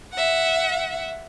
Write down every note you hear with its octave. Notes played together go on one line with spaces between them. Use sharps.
E5 F#5